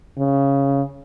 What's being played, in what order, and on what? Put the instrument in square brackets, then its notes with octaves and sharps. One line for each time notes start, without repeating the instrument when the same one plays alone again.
[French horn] C#3